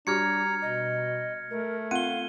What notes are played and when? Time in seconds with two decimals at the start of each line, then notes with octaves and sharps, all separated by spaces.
0.07 G3 D4 F#4 G4 A#5 F6 G#6 C#7
0.62 B2 D#5
1.51 A3 A#4
1.91 C4 F4 F5 F#5 D#7 G7